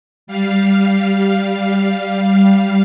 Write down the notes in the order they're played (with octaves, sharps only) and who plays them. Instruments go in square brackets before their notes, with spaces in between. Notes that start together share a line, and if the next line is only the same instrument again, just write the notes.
[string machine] G3 F5